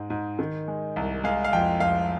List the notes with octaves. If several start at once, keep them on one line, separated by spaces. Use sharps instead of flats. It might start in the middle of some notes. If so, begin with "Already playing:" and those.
Already playing: G#2 G#3
G#2
D#3
G#3
C2
G#3 F5
F5
F2 G5
F2 F5